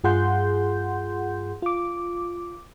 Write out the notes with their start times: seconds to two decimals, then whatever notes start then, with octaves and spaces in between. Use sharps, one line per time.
0.04 G2 F4 G#4 F#5 C6 G6
1.62 F4 D6